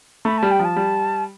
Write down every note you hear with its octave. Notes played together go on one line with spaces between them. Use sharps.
A3 B5
G3 A5
G5
F3 A5
G3